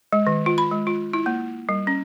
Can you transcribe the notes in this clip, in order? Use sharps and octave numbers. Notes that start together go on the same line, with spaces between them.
G#3
D#3
F4
B5
G#3
F4
E4
A#3
G3
C#4